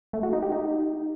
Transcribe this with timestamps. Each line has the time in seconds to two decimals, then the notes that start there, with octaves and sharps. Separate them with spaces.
0.13 A3
0.23 F#4
0.33 D#4
0.42 G4
0.52 D#4